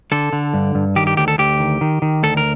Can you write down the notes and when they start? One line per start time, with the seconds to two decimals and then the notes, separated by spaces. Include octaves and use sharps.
0.12 D3 A4
0.33 D3
0.54 G2
0.75 G2
0.96 D#3 G4
1.07 G4
1.17 D2 G4
1.28 A4
1.39 D2 G4
1.60 D#3
1.81 D#3
2.02 D#3
2.23 D2 A4
2.37 A#4